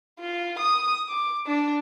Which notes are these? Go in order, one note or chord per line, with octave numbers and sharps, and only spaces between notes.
F4
D#6
D6
D4